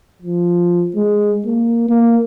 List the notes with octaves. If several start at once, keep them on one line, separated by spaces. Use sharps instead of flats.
F3
G#3
A#3
A#3